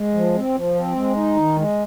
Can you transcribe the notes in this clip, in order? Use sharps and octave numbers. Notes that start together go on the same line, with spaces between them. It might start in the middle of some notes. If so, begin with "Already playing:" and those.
Already playing: G#3
F3
C4
F3
C4
G#3
D#4
D#3
G#3